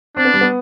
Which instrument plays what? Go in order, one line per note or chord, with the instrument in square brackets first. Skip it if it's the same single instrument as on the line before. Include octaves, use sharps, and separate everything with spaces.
[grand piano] C4 [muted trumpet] D4
[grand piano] B3
G3
B3